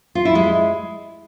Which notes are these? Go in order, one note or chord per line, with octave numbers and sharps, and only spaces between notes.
F4
E4
G#3